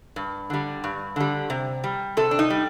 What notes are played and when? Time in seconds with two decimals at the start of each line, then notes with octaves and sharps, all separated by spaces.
0.16 G2
0.50 D3 G3
0.84 G2
1.16 D3 G3
1.50 C3
1.84 G3
2.17 C3 A4
2.31 D4
2.39 D#4
2.50 G3